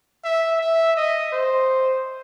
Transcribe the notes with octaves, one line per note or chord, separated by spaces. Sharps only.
E5
E5
D#5
C5